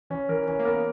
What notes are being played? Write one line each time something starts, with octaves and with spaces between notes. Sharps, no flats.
E3 C#4
E3 A#4
E3 C#4
A#3
B3 A#4